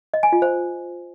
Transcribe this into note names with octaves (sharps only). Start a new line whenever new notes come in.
D#5
G#5
F4
C5